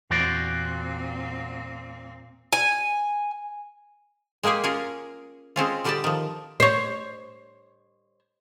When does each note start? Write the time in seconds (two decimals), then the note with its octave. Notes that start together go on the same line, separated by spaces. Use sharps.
0.11 E2 A#2 C4 F#4 C5 D5
2.53 G#5
4.43 G#3 A#3 G4 G#4 G#5
4.64 C#4 F4 G#4 A#4
5.56 G#3 C4 C#4 F4
5.84 D3 G3 G4 D5 D#5 A5
6.04 D#3 F3
6.60 C5 C#5